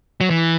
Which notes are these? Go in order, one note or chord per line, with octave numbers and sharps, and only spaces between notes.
F#3
E3